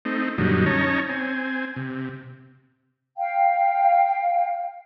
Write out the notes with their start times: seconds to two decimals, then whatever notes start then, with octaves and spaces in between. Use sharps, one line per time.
0.05 A3 C4 D#4
0.38 F#2 A#2 D3 F#3 G3 D#4
0.66 C#4 D#4 C#5 A5 A#5
1.09 C4 G#5
1.76 C3
3.17 F5 G5